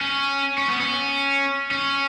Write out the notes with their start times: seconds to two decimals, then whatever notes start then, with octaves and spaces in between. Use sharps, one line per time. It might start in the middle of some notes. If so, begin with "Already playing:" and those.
0.01 C#4
0.58 C#4
0.69 B3
0.81 C#4
1.71 C#4